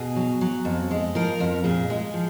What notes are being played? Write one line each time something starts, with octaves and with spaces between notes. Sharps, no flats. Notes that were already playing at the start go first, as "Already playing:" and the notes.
Already playing: B2 G#4
F#3
F#3
F2
G#3
F3 A#4
F2
A#2 G#4
G#3
F3